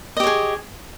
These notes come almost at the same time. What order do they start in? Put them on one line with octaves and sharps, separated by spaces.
D#5 G4 C#5 G#4